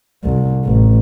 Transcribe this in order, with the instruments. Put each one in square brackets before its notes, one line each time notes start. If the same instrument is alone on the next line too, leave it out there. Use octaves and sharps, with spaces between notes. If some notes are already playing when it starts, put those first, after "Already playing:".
[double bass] C2
A1